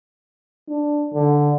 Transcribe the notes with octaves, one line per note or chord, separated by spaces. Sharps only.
D4
D3